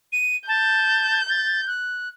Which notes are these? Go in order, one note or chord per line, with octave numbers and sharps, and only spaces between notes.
D#7
A5 G6
A6
F#6